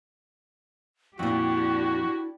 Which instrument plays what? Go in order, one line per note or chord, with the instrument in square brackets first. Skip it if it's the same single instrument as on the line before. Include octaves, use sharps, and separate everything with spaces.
[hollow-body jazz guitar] F2 A#2 [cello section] D4 G4 [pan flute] E4 [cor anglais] F#4